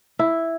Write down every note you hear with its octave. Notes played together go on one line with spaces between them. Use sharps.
E4